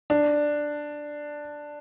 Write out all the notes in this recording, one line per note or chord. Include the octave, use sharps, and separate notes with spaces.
D4